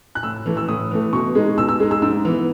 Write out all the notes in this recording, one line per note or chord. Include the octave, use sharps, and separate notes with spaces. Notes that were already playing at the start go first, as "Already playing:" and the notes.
F#6
A2 E6
E3 A3
E6
A2 D#6
E3 A3
B2 C#6
G#3 D#4
B2 E6
E6
G#3 D#4
E6
G#2 E6
E3 B3